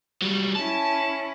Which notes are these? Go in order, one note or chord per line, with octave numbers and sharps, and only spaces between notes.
F#3 G3
C#4 E4 A5